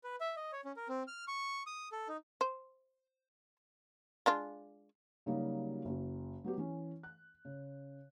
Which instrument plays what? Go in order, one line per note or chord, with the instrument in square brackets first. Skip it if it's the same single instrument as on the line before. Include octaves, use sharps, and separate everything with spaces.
[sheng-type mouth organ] B4
E5
D#5
C#5
C#4
A#4
C4
F6
C#6
D#6
A4
D#4
[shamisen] C5
G#3 D4 F4
[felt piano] C#3 F#3 G3 A#3 D#4 F#4
F#1 F#4
F#3 B3 G4
E3 C#4
F#6
C#3